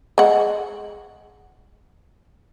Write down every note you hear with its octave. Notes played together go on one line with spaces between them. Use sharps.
G#3 F#5